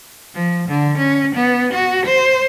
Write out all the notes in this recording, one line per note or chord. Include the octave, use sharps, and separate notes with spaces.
F3
D3
C#4
B3
F#4
C5